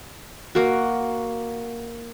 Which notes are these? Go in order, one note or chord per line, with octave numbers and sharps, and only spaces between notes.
A#3 F#4